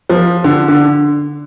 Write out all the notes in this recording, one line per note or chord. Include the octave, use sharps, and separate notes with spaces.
F3
D3
D3